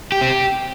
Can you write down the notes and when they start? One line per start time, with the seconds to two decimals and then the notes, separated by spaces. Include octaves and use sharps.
0.12 G4
0.21 C4